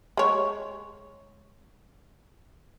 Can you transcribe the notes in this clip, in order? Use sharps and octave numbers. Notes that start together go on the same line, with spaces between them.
G#3 C#5